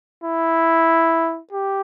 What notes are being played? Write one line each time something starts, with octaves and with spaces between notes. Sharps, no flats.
E4
G4